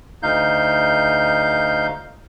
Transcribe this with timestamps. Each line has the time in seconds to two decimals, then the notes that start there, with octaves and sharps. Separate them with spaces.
0.23 D2 D#4 F5 G6